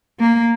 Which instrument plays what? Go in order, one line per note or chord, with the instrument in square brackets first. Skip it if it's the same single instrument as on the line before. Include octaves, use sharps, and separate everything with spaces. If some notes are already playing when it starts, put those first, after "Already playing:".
[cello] A#3